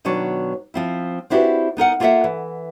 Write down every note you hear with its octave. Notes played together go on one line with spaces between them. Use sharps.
B2 D#3 F#3 D4 C#5
F3 C4 E4
C4 D4 E4 F#4 G4 B4
B3 D#4 A#4 F#5
A#3 F4 A4 D5 E5 F#5
E3